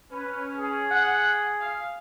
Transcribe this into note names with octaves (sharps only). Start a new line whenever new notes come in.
C#4 B4
G#4
F#5
F5